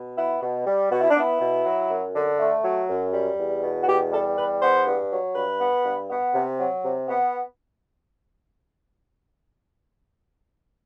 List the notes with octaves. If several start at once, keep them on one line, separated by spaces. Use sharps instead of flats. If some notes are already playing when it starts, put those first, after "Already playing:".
Already playing: B2
B3 E4
B2
G3
B2 F#4
E4
D4
B3 E4
B2
F#3
F#2
D3
A3
F#3
F#2
G3
E2
B2
F#4
E2 G4
G3 A4
E2 B4
B3 C5
G2
F#3
G2 B4
B3
G2
B3
C3
F#3
C3
B3